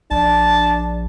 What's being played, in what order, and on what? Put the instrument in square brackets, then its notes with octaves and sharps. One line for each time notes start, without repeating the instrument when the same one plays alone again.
[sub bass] A#1 [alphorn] D4 [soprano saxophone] A5